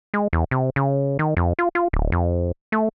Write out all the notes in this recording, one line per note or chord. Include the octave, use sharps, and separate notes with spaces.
G#3
E2
C3
C#3
D#3
F2
F4
F4
D1
F2
A3